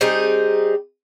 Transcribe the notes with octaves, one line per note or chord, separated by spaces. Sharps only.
G3 C4 D#4 G#4